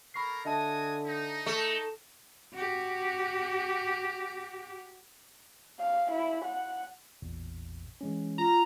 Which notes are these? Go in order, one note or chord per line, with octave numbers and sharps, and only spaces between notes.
A#3 A4 A#4 B5 C#6 C7
D3 F#4 D#5 E5 G#5 A5 D#6
D#4
A3
F#4 G4
F5
E4
F#5
A1 E2 A#2
E3 G#3 C#4
F4 A#5